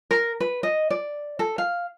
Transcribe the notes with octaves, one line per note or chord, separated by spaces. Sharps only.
A#4
B4
D#5
D5
A4
F5